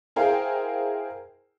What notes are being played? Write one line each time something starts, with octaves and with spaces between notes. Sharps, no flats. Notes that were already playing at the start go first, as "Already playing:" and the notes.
E4 G#4 A#4 C5 F5 G5